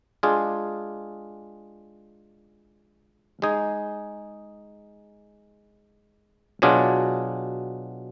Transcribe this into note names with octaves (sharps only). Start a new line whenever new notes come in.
G#3 D4 F4 G#4
G#3 D#4 G#4
B2 F#3 D4 F4 G#4